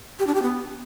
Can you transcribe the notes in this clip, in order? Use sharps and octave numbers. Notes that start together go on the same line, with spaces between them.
G4
D4
G4
B3